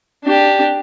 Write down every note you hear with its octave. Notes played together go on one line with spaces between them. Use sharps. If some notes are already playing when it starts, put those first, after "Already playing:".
D4 G4